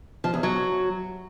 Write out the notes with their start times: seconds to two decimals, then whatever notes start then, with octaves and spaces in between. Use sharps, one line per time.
0.24 F3
0.34 E2
0.43 F#3